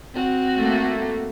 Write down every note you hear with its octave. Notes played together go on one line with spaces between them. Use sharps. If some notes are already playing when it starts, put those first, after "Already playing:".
C4 F#4
A3 A#3